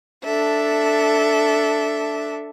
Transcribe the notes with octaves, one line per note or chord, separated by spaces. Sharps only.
D4 A4 E5